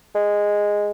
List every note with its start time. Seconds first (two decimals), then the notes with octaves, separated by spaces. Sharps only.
0.15 G#3